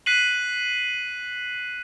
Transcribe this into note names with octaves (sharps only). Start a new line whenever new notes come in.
F#6 B6 C7 D#7 F#7